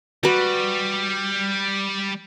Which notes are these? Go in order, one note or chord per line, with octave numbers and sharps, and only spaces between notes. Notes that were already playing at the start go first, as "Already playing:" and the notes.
G3 F#4 B4